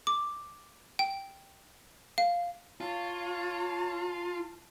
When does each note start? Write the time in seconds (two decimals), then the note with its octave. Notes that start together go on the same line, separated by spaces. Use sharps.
0.07 D6
0.99 G5
2.18 F5
2.81 F4 C#5 A5